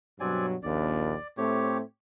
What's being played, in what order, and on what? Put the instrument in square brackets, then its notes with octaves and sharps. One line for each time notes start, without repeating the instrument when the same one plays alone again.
[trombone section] G2 B2 F#3 [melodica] C4 D5 G#5
[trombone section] A#1 D#2 [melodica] D5
[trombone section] A2 A3 C4 [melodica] G4 C#5